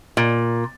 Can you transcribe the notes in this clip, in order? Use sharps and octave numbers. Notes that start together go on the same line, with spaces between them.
A#2